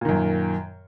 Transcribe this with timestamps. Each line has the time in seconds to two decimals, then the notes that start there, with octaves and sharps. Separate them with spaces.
0.01 A#2
0.05 D#3
0.09 F#2